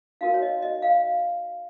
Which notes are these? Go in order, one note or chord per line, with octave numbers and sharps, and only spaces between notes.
D#4 F#4 A#4 F5
C#5
D#5
D#5
F5